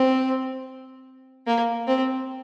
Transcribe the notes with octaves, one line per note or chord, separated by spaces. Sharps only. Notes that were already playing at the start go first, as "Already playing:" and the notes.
Already playing: C4
A#3
C4